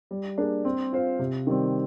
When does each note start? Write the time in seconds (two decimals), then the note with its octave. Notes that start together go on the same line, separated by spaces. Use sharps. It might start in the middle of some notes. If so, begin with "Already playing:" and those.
0.11 G3
0.38 A#3 D4 G#4
0.65 C4
0.92 F4 C5 F5
1.19 C3
1.47 D#3 G3 C4